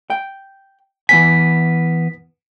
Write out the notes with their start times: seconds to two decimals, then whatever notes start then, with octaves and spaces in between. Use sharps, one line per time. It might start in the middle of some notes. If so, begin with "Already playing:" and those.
0.10 G5
1.09 E3 B3 G#5 B6